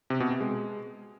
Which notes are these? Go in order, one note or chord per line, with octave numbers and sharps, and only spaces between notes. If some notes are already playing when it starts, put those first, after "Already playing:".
C3
B2
C3
G#3